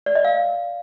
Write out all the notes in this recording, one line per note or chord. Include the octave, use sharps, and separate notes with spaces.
D5
D#5
F5